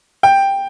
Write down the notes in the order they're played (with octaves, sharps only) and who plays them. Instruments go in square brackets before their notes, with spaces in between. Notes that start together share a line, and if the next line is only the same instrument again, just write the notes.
[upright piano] G5